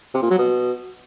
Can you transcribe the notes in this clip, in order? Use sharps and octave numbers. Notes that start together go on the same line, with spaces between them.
C3
A#2
F#3
B2